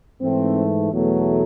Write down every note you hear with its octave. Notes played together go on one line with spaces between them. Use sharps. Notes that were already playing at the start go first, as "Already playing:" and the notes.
G#2 E3 A3 C4
E2 B2 F#3 A3